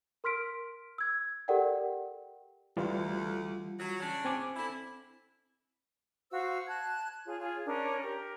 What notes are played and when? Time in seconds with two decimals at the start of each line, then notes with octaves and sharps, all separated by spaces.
0.24 A#4 C6 F6 B6 D7
0.98 E6 G#6
1.48 G4 A4 A#4 D5 F#5 G5
2.77 D2 E3 G3 F4
3.78 F#3
3.99 C#3 C#4 D4
4.25 C4 G#5 D6
4.56 D3 E4
6.32 F#4 C5 F5 E6
6.67 A5 F#6 G#6
7.26 F4 G#4 C#5
7.40 F4 G#4 C#5
7.66 C#4 D4 A#4 C#5
8.03 G4 A#4